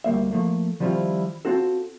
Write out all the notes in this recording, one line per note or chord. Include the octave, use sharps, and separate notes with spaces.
D2 G3 A#3 E5
F3 A3 A#3
D#3 F3 G3 C4 E4 F4
C4 F4 F#4 A4